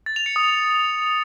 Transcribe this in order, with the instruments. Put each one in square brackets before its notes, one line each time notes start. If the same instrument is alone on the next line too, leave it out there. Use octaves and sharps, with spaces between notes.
[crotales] A6
F7
C#7
D#6